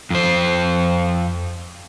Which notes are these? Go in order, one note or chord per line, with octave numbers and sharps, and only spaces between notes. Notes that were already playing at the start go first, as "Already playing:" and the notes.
F2 C5